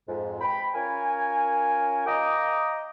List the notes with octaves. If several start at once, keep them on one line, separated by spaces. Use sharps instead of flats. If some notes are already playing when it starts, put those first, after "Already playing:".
F2 G#2
G5 B5
C#4 F4 A#4 G#5
D#5 F5 G5 A#5 D6 D#6